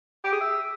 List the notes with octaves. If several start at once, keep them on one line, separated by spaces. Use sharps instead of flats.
G4
G#4
E5